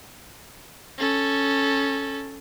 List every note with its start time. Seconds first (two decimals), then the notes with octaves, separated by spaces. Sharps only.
0.98 C#4 A4